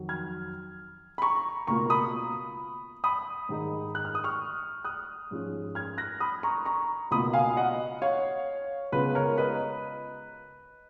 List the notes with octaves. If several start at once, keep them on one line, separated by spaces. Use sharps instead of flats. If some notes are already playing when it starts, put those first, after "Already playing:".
Already playing: F2 D#3 F#3
F6 G#6
B5
A#5 C#6
C#2 B2 A#3 F4 A#5 C#6
B5 D#6
B5 D#6
G#2 D#3 G#3 D#4
F#6
F6
D#6
C#6 F6
D#6 F#6
G#2 F3 G#3 C#4 F4
F6 G#6
F#6 A#6
B5 D#6
A#5 C#6
A#5 C#6
C#2 B2 A#3 F4 B5 D#6
F5 G#5
D#5 F#5
C#5 F5
C#2 C#3 G#3 B3 F4 B4
A#4 C#5
B4 D#5